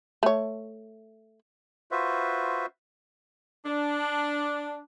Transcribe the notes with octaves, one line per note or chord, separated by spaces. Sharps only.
A3 C#5
F4 F#4 B4 C5 E5
D4